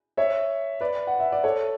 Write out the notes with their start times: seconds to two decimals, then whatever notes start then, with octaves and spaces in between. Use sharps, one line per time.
0.17 C#5 E5
0.81 B4 D5
1.07 F#5
1.20 E5
1.32 D5
1.44 A4 C#5